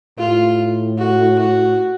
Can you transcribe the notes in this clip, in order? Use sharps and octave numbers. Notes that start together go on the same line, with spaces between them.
A2 F4
F#4
F#4